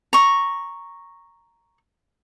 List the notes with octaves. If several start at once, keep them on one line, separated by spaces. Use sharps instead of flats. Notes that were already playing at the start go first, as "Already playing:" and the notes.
A#5 C#6